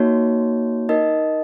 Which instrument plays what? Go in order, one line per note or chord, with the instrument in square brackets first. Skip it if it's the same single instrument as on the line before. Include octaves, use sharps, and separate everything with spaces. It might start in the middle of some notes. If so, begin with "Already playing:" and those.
Already playing: [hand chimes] A#3 D#4 F#4 C#5
D#4 A#4 D#5